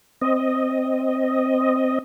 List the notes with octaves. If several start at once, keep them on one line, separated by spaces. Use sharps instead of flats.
C4 D#5